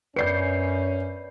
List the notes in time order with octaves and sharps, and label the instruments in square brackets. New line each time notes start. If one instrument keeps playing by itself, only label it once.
[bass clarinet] F#2 [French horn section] C#4 [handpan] B4 D5 [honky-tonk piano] G6 C7 C#7